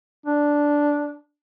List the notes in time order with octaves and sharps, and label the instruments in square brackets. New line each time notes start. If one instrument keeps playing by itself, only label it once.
[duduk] D4